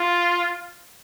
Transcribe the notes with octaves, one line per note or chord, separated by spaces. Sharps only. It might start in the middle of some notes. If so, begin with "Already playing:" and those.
Already playing: F4